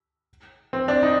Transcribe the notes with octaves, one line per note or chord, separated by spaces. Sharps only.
C4
D4
D#4